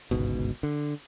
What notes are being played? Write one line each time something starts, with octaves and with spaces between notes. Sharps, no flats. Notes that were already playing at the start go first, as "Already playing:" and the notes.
G1 C#2 G#2 B2
D3